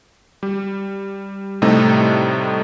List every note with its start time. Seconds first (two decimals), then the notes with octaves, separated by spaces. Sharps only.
0.43 G3
1.62 A2 C3 G3 A3 D#4